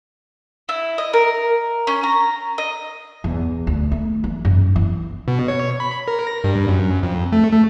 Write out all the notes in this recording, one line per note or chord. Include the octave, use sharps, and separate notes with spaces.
E4
D#5
A#4
C#4
A#5
D#5
E2
D2
A3
E3
F#2
E3
B2
C#5
B5
A#4
A#6
G2
F#2
F2
A3
A3